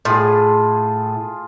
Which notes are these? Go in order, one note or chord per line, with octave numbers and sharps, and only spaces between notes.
A2 F4 G#4